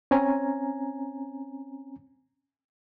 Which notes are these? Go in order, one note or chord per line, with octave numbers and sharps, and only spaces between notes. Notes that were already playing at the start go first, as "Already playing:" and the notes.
C4 C#4 G#5 A#5